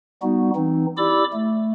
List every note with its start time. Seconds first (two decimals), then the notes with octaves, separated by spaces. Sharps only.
0.22 G3 B3 D#4 F#4
0.55 E3 C4 D#4
0.98 E4 G4 D5 B5 D6 E6
1.33 A3